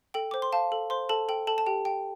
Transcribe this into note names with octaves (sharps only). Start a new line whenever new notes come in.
A4 G5
C5 D6
C6
F5 A5
A4
C5 C6
A4 A5
A4 G5
A4 A5
A5
G4 G5
G5